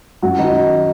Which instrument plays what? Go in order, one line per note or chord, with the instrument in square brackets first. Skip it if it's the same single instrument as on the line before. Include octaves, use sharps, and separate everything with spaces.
[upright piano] F#2 F#4
D#3 D#4